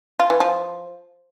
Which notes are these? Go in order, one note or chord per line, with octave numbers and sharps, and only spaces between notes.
F4
E3
F3